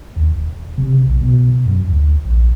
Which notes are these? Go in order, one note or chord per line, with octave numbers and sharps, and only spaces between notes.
D#2
E1
C3
B1
B2
F#2
D2
A#1